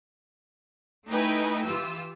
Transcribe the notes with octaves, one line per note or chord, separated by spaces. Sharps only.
A3 D#4 E4 B4 G5 G#5
E3 F4 G4 E6